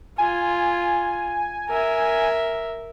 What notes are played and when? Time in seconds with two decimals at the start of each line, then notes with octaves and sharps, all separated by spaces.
0.18 F4 G#5
1.69 A#4 E5